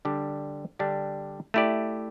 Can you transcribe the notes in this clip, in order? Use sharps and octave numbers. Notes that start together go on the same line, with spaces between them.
D3 G3 D4 G4
D3 G3 D4 G4
A3 E4 G4 D5